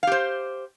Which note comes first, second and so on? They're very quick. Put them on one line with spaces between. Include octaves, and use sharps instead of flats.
F5 G4 C5